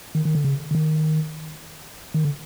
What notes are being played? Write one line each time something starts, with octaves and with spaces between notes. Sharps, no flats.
D#3
D#3
D3
C#3
D3
D#3
D#3
D3